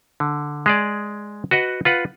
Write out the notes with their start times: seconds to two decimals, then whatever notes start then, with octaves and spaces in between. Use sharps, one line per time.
0.20 D3
0.66 G#3 G#4 D5
1.51 F#4 B4 D#5 F#5
1.85 F4 B4 F#5